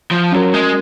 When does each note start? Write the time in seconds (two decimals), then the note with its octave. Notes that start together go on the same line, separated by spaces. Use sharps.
0.11 F3
0.32 F#3 C#4 F#4 A#4
0.54 G#3